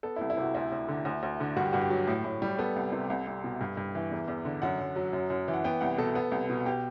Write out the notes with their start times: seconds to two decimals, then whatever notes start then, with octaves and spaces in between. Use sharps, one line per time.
0.03 B3 A4
0.16 E4
0.21 C2
0.30 E4
0.37 C3 F#4
0.55 D2 E4
0.72 D2
0.88 D3
1.05 D2
1.23 D2
1.40 D3
1.57 G2 F#4
1.65 G4
1.73 G2 F#4
1.81 G4
1.90 F#3
2.07 A2
2.24 A2
2.42 G3
2.59 B3 A4
2.76 C2
2.92 C3
3.10 C2
3.27 C2
3.44 B2
3.61 G2
3.77 G2
3.95 E3
4.11 E2
4.28 E2
4.45 D3
4.62 F#2 F#5
4.79 F#2
4.96 F#3
5.13 F#2
5.30 F#2
5.48 E3
5.53 F#5
5.64 B3 G5
5.81 C2 F#5
5.98 B2 A4
6.15 B3
6.32 C2
6.50 B2
6.66 B2 G4